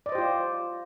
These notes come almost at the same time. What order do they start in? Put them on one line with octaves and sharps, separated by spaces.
D5 D#5 C5 G4 F4